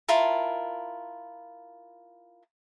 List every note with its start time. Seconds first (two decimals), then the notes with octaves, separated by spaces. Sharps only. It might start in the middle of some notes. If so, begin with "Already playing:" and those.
0.08 E4 F4 A#4 A5